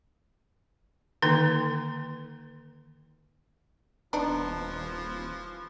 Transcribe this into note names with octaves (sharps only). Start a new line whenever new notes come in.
D3 D#3 A#3 D#4 B4 G5
D#1 E3 F3 B3 D4 D#4